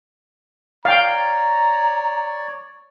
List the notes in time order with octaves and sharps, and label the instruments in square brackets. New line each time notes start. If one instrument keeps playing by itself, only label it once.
[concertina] C#5 D5 [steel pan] F5 G5 [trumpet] A#5